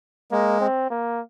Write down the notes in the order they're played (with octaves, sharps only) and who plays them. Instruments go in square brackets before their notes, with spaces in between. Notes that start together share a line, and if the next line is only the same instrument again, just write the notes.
[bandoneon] G#3 [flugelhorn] A#3
[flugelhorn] C4
A#3